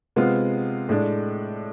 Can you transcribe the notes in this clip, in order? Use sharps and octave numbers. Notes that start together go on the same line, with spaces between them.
C3 G#3 B3 F4
A2 G#3 D4